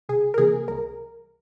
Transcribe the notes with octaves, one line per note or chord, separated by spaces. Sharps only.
C2 G#4
A#4
C3 E3 A#3 G#4
C2 A#4